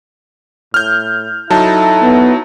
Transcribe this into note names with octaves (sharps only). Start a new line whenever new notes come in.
A2 F6 G6
F#3 D#4 E4 A4 A5
B3